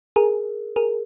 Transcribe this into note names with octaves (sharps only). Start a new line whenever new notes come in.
G#4 A#4
G#4 A#4